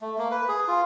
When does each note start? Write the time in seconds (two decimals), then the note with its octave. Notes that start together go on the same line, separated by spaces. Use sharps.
0.01 A3
0.18 A#3
0.31 B4
0.48 G#4
0.68 F4